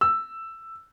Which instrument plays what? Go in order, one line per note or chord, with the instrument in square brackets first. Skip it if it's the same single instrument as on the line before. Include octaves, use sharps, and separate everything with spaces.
[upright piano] E6